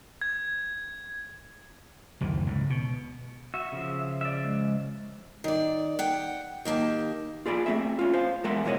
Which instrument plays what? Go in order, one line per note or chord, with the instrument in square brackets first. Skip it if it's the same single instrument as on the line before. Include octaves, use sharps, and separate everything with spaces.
[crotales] G#6
[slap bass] F#1 D2 D#3 E3
C#2 G#2
B2
[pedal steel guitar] F#4 [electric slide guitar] E5
[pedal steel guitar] C#3 F3
[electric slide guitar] D5 E5
G#3
[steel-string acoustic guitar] D#3 D5
F#5 G5
D#3 A#3 G4 A5
[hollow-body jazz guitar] F4 G#4 D5 B5
A3 C4 G#4 E5
C#4 F4
C5 F5
E2 G#3 A#4 E5 F#5 C6
B2 E3 G#3 F#4 C#5 D#5